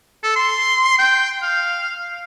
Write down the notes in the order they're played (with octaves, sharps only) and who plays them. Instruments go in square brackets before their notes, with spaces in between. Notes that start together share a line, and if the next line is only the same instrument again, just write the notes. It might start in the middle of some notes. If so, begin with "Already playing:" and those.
[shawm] A4
C6
G5
F5